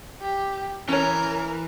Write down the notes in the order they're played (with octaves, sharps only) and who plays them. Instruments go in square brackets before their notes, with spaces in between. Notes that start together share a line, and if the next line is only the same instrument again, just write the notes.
[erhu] G4
[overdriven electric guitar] E3 [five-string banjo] C#4 C#5 [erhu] A#4